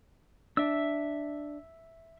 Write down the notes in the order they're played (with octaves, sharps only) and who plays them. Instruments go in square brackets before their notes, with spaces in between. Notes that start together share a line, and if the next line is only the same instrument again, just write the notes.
[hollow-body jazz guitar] D4 [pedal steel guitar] E5 E6